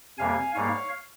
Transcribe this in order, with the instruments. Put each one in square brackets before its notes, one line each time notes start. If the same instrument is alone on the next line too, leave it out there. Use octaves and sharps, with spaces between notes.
[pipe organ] F2 C3 G3 A#3 F5 G#5
G#2 G3 A#3 C#5 F5